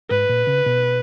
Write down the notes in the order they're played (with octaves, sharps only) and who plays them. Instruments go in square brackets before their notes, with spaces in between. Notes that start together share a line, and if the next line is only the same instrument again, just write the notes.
[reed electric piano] G#2 [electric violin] B4
[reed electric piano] A#2
C#3
B2